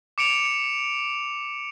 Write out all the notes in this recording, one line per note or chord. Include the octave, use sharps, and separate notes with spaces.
D6 C#7 D7 F7